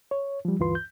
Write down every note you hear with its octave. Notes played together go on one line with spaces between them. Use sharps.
C#5
F3 G3
D2 G2 E3 F4 B4 C6
G6